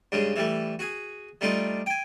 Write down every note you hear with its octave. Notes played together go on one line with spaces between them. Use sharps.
G2 C#3 G#3
E3 G3 A3
F#4 G#4
G3 A3 D4 D#4 F4
G5 G#5